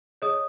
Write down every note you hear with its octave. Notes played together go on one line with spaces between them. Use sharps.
G#4 C#5 D#5 D#6